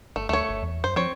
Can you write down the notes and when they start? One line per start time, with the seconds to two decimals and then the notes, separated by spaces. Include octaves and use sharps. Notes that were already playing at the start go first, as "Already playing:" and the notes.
0.16 G1 A3
0.29 D2 A3 C#5
0.49 G1
0.63 E2
0.84 F#2 C5
0.96 F3 C4 C#5